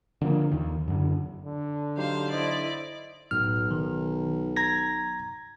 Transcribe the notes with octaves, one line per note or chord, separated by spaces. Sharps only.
D3 F3 A#3
D#2 D#3
F#2 D3
D3
F#3 D#4 G4 C5 F5
E4 C5 D5 D#5 C6
B1 A2 F6
D#3
A#5 G#6 A#6